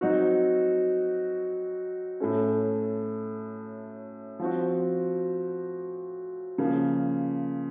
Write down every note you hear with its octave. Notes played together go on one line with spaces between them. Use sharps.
F#3 C4 D#4 F#4
A2 A3 C#4
F3 C4 F#4
C#3 F3 A#3